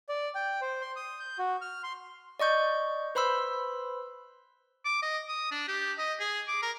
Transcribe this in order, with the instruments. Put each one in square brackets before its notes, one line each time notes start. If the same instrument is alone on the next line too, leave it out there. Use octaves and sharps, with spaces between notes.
[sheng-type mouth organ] D5
G5
C5
C6
D#6
G6
F#4
F6
C6
[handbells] D5 D#5 C#6 G6
B4 C5 B5 C6 E6
[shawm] D6
D#5
D#6
D4
G4
D#5
G#4
D6
A#4